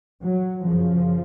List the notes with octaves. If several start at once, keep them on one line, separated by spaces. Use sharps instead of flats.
F#3
F#2 C#3 F3